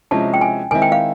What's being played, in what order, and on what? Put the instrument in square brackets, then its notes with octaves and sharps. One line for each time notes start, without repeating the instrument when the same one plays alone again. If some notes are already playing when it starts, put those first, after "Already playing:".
[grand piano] C3 F3 G#3 C#4 E4 [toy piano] A5
[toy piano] G5
G#5
[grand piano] D#3 G#3 C4 E4 [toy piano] G#5
[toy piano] G5
F5